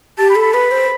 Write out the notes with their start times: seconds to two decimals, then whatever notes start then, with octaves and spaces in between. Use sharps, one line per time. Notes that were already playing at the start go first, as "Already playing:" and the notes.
0.18 G4 A5
0.30 B5
0.36 A4
0.42 B5
0.53 B4 B5
0.71 C5